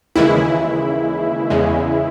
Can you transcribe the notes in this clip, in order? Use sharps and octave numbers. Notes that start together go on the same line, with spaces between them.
D#2 C#3 E3 G#3 E4
E2 C#3 G#3